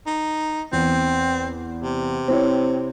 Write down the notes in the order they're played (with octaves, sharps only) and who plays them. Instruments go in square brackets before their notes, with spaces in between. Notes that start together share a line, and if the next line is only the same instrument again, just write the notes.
[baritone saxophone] D#4
[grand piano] E2 [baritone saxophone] C4
[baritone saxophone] C3
[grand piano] C4 E4 C#5